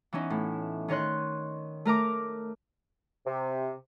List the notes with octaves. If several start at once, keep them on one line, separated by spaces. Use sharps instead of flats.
E3 B3 C#4 D#4
A2
D#3 D#4 C#5 C6 F#6
A3 A#4 A#5 D6
C3